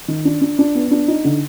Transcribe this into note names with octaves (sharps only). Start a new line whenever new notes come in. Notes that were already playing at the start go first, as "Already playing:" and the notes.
D#3
D4
D4
D4
B3
D4
D#4
D3